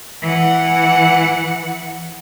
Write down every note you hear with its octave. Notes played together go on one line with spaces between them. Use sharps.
E3 F#5